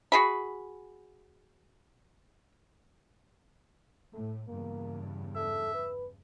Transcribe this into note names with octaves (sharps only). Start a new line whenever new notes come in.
F#4 G#4 B5
A2 A3
E2 G2 C#3 A#3
A4 E5
B4